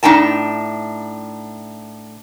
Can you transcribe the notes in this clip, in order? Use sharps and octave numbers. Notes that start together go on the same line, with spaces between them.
A2 D4 D#4 G5 A5